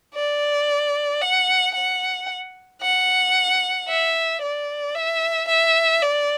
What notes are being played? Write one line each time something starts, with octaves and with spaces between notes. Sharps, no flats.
D5
F#5
F#5
F#5
E5
D5
E5
E5
D5